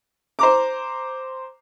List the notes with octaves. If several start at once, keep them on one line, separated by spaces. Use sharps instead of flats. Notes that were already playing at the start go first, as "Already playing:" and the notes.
C5 A#5 D6